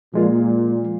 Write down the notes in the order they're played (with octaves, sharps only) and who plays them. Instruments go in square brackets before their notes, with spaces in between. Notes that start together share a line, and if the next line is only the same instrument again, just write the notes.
[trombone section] A#2 [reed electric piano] F3 G#3 F4